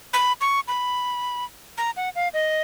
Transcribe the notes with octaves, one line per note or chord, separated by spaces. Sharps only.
B5
C#6
B5
A#5
F#5
F5
D#5